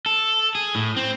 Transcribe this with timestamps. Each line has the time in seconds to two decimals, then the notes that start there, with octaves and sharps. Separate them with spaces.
0.06 A4
0.55 G#4
0.75 A2
0.96 C4